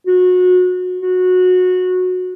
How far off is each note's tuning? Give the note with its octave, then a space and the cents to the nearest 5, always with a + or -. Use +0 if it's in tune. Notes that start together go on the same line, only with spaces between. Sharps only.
F#4 -25
F#4 -20